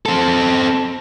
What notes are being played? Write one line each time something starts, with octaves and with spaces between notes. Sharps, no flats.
C4 A4